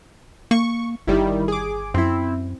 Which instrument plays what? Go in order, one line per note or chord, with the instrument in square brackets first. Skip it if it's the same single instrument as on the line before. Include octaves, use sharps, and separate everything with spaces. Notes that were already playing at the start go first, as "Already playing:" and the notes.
[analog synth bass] A#3 [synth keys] C#6
[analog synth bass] G1 [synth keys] D#3 G3 E4
[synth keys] G#4 D6
[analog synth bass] F#2 [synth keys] C4 E4